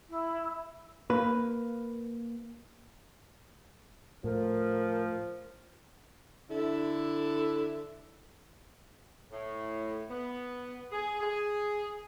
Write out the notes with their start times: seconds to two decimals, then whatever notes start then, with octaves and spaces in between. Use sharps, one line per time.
0.09 E4
1.10 A#3 B4
4.24 A2 F3 A#4
6.50 D3 E4 A4
9.32 A2
10.10 B3
10.91 G#4
11.20 G#4